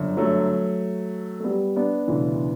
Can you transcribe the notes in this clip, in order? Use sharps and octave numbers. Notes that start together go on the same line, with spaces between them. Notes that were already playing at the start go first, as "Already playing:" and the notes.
Already playing: G1 F#2 D3
F#3 A3
A3
G3 B3
B3 D4
E1 D2 C#3 E3